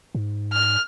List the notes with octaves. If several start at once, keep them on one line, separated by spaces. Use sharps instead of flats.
G#2
F6